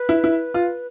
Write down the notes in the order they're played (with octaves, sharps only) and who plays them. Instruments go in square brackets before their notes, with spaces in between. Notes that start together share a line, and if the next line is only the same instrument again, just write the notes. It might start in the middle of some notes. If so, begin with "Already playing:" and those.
Already playing: [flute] B4
[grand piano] E4
E4
F4